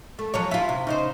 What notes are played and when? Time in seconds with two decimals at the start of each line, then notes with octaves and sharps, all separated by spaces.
0.19 A3
0.34 F3 F#3 C#5
0.51 E4 F4
0.69 C3
0.87 C#3 D#4 C5